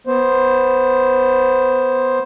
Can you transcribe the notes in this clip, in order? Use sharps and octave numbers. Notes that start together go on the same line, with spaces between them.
B3 C5